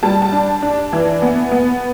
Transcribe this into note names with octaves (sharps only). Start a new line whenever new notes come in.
G3 A5
A5
D4
D4
E3
B3
B3